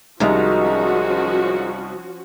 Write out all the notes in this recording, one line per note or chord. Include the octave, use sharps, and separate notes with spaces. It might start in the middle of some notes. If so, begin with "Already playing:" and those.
C2 D#3 F3 G#3 C#4 D#4 F#4